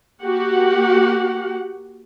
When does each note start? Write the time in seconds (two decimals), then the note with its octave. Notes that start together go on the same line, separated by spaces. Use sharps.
0.23 A#3 F#4 G4 F#5